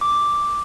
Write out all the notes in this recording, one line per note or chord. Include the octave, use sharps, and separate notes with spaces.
D6